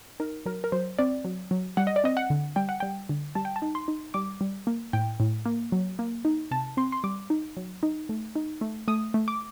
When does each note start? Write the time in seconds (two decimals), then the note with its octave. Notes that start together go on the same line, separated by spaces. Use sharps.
0.20 D#4 A#4
0.46 F#3 A#4
0.64 A#4
0.72 F#3 C5
0.99 C4 D5
1.25 F#3
1.51 F#3
1.77 G3 F#5
1.87 D#5
1.96 D5
2.04 C4 D#5
2.17 F#5
2.30 D3
2.56 G3 G5
2.69 F#5
2.80 G3 G5
3.09 D3
3.35 G3 A5
3.45 G5
3.56 A5
3.62 D#4
3.75 C6
3.88 D#4
4.14 G3 D6
4.41 G3
4.67 A#3
4.93 A2 G5
5.20 A2
5.46 A#3
5.72 F#3
5.99 A#3
6.25 D#4
6.51 C3 A5
6.77 C4 C6
6.92 C6
7.04 G3 D6
7.30 D#4
7.57 F#3
7.83 D#4
8.09 A3
8.36 D#4
8.61 A3
8.88 A3 D#6
9.14 A3
9.28 D6